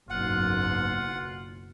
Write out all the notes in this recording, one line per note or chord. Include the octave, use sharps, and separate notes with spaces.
F#1 B1 G#2 F4 F#5